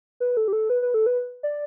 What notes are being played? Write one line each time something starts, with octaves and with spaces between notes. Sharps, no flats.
B4
A4
G4
A4
B4
B4
A4
B4
D5